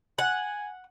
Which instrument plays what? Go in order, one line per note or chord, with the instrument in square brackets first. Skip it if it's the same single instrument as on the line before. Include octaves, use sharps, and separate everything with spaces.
[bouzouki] F#5 [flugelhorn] G#5